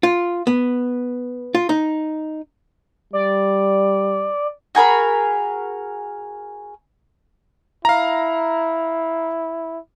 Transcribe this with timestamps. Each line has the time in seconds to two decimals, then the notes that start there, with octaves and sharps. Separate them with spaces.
0.03 F4
0.47 B3
1.55 F4
1.69 D#4
3.13 G3 D5
4.75 F#4 G#4 A#4 B5
7.85 E4 F5 A#5